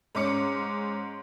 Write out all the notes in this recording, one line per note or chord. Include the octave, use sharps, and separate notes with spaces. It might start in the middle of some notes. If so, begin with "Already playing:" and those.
G#2 C#4 D6 C#7